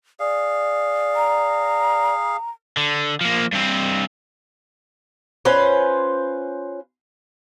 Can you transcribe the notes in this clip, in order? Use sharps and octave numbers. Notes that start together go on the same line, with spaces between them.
G#4 D5 F5
A#5
D3
F3 A#3
G2 C4
C#4 F4 B4 C5